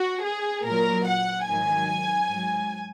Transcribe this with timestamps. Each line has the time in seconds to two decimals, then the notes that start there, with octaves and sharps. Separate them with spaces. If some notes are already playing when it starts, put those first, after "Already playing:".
Already playing: F#4
0.25 G#4
0.66 A#2 F#3 A#4
1.07 F#5
1.48 G#2 D#3 F#3 G#5
2.31 G#2 F#3